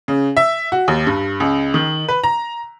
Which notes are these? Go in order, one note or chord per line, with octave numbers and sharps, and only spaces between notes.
C#3
E5
F#4
D#2
G2
C#2
D#3
B4
A#5